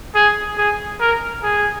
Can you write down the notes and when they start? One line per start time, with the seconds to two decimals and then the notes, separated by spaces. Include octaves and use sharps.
0.15 G#4
0.57 G#4
1.00 A#4
1.43 G#4